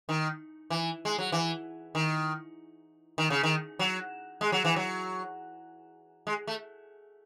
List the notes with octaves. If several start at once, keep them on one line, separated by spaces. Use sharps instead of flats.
D#3
E3
G#3
F#3
E3
D#3
D#3
C#3
D#3
F#3
G#3
F#3
E3
F#3
G#3
A3